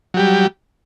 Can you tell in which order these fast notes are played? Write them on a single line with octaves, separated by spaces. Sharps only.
F#3 G4 G3